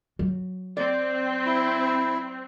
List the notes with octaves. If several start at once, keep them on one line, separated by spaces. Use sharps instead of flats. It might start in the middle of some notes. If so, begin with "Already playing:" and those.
F#3
C4 D5
E4